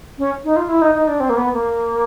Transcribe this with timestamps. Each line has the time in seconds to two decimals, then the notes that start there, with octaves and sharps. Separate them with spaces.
0.18 C#4
0.44 D#4
0.56 F4
0.69 E4
0.82 D#4
0.95 D#4
1.08 D4
1.20 C4
1.30 A#3
1.37 B3
1.53 A#3